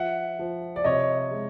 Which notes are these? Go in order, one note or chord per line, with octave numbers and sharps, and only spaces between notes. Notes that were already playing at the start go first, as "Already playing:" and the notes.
Already playing: F3 E5 F#5
F3
D5
C3 C#5 D#5
G#3